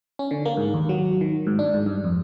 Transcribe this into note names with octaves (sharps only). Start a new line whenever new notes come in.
C#4
D3
A#3
G#2
D#2
F#3
D#3
G#2
D4
G#2
G2
F2